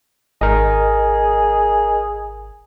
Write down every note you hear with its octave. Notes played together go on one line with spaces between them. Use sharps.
G#1 G#4 A#4 D#5